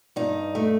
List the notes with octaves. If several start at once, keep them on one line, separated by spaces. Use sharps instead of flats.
G2 D#4
A3